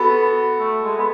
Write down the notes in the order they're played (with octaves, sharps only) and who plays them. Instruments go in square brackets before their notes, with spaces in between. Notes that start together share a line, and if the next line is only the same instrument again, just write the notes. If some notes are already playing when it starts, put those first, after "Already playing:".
Already playing: [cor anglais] B3 [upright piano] F#4 A4
[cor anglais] A3
G#3
B3